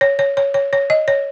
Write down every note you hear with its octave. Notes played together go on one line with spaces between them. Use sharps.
C#5
C#5
C#5
C#5
C#5
D#5
C#5